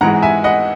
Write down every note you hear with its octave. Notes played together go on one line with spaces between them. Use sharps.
G#2 E3 G#3 F#5 A#5
E5 G#5
D#5 F#5